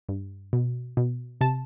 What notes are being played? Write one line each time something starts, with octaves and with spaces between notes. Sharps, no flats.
G2
B2
B2
C3 A5